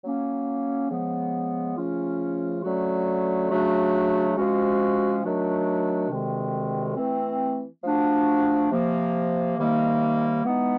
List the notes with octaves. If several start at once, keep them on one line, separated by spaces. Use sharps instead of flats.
F#3 A#3 C#4
C#3 F3 G#3 B3
C#3 F3 A3 C#4 F4
D3 F#3 A3 C#4 F#4
C#3 F#3 A3 D4 F#4
C3 F3 G#3 C#4 F#4
D#3 F#3 A3 D4 F#4
D2 C3 D#3 G#3 C4
E3 A3 C4
F3 A3 D4 F#4
C3 F3 A#3
C3 D#3 G3 A#3 D#4
E3 G#3 B3 D#4